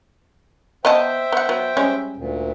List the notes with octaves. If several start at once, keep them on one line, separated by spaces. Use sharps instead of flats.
B3 C5 D#5 E5 G5 A5
B3 F#5
F#3 B3
G3 G#3 C#4
D2 A#2